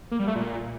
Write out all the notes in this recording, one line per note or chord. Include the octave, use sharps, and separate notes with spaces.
A#3
G3
A3
A#2